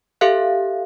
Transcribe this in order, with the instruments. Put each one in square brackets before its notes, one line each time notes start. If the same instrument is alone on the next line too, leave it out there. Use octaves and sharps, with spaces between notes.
[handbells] G4 A4 E5 F5 F#6